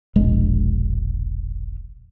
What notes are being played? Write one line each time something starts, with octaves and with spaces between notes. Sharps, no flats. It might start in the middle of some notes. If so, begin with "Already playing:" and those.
E1 A#1 G#3